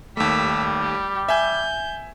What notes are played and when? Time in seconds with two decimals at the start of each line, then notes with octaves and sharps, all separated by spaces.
0.17 D#2 G3 A3 E6 B6
0.81 G4
1.29 E5 G#5 G6